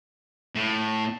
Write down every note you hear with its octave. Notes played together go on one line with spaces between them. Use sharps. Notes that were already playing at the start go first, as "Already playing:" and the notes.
A2